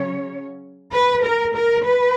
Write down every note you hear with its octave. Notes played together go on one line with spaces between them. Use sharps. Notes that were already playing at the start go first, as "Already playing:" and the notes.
Already playing: C#3 F#3 C#4 C#5
B4
A#4
A#4
B4